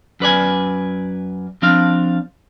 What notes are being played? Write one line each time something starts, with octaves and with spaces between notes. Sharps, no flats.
F#2 B4 D5 G#5
F3 C4 D4 F5